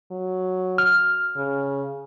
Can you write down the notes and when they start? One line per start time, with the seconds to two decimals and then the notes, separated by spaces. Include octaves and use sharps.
0.12 F#3
0.78 F6
1.37 C#3